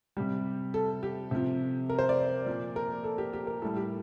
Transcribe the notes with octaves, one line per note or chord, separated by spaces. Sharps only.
C3 G3 G4
A4
G4
C3 F3
A#4
C5
D5
A#2 F3
A#4
A4
G4
G4
A#4
A2 G3 A4
G4